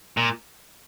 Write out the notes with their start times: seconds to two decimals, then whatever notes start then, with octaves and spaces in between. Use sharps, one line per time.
0.17 A#2